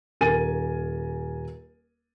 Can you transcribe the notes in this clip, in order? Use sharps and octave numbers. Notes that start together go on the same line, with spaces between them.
D#1 A#4 G#5 A6 D#7